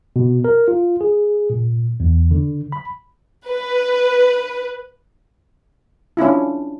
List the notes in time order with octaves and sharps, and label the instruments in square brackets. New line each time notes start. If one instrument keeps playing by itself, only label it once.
[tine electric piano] B2
A#4
F4
G#4
A#2
E2
D3
B5
[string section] B4
[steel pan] C#4 D4 E4 F4